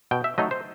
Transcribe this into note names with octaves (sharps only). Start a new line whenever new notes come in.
B2 G5
E5
F#3 A3 D#4 D#5
C5